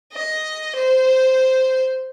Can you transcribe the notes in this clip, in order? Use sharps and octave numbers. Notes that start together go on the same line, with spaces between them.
D#5
C5